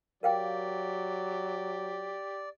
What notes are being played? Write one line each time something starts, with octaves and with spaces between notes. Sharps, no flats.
F#3 G4 A#4 D5 F5 G5